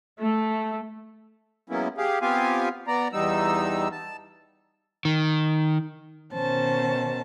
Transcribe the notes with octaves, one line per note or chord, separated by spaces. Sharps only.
A3
F#3 G#3 A#3 B3 C#4 E4
G4 G#4 F5
B3 C4 F4 G4 F5 G#5
B3 D5 A#5
E2 G3 D#4 E6
A5
D#3
B2 D#3 C#4 C5 A5